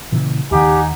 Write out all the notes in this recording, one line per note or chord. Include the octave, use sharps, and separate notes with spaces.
A#2 C#3 E3
D#2 D#3 D#4 G4 F#5 G#5